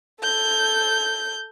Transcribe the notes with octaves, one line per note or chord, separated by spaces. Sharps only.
A4 G6